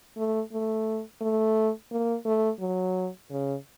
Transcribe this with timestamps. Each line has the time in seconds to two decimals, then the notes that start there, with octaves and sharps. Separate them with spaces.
0.17 A3
0.52 A3
1.21 A3
1.92 A#3
2.26 A3
2.60 F#3
3.30 C#3